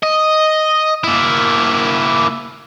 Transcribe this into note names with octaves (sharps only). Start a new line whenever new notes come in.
D#5
A#3 E4